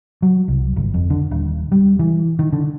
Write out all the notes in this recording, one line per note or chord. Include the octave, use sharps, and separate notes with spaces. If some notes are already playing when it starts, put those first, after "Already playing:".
F#3
C2
G1
F2
D3
D#1
G3
E3
D#3
D3